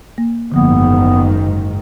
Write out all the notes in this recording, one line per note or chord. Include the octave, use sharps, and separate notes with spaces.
A#3
F#1 G#2 D3 D#3 F3 A#3 B3